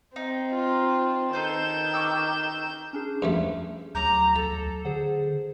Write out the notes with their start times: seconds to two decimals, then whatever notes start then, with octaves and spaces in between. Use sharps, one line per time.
0.16 C4 D#4
0.51 F4
1.33 D#3 A4 B4 C5 G6 E7
1.94 C#6 D6 E6
2.93 C#4 D4 G#4
3.22 G2 F3 A3
3.95 D2 F#3 A#5 D6 G6
4.36 A4 A5
4.85 D3 G#4 C5 F#5